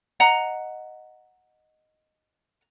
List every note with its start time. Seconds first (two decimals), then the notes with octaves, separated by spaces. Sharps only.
0.20 D#5 F#5 A#5